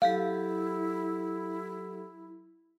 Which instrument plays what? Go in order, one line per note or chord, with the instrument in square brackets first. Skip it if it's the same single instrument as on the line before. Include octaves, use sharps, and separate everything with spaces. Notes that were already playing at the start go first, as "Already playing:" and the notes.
[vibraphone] F#3 G4 A4 [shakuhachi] E4 [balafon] F5